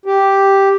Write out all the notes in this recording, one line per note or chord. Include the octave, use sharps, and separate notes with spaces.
G4